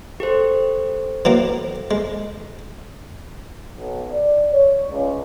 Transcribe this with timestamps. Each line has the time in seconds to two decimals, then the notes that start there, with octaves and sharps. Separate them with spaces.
0.20 G4 A4 C5
1.25 E3 F#3 A#3
1.91 G#3
3.75 B1
4.11 D5
4.50 C#5
4.89 C#2